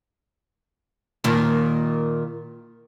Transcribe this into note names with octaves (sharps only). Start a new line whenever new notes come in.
A#2 D#3